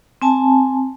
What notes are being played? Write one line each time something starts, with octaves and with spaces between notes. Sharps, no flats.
C4 G#5 A5